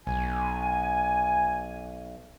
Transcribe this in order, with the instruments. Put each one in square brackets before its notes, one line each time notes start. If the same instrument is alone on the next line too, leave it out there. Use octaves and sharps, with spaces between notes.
[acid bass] B1 [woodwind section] G#5